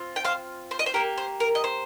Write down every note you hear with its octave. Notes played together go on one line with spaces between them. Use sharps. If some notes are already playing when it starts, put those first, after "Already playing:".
Already playing: C4 F4
G5
C5 F5
C5
D#5
C5
A#3 G4 A#4
C5
A#4
D#5
C5